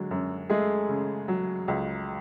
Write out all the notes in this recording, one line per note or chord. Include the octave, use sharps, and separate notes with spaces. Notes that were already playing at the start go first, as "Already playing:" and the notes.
Already playing: D3 F#3 G#3
F#2
G#3 A3 G#4
C#3
F#3
C#2